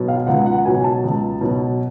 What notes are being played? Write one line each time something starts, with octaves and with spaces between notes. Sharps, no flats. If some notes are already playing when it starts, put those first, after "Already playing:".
Already playing: B2 F#3
F5
C#2 F#5
F#5
B2 F#3 G#5
A5
C#2
B2 F#3